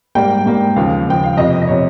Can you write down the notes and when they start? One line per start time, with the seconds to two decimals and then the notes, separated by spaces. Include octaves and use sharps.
0.15 G#2 G3 A#3 G5
0.46 G#2 G3 A#3
0.76 D#2 C#3 F3 F5
1.07 D#2 C#3 F3 G5
1.23 F5
1.37 F2 C3 F3 D#5
1.62 D#5
1.67 C3 F3 C#5